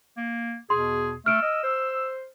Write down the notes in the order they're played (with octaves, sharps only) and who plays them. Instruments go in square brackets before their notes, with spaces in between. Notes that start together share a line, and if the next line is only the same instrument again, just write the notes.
[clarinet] A#3
[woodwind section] E2 B2 [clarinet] G#4 [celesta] C6
[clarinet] A3 [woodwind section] E6 [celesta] F6 D7
[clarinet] D#5
C5